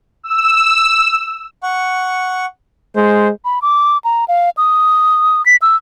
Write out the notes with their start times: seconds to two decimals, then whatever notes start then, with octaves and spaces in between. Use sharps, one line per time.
0.23 E6
1.63 F#5 C#6
2.96 G#3 C5
3.45 B5
3.62 D6
4.05 A#5
4.28 F5
4.57 D#6
5.46 B6
5.62 E6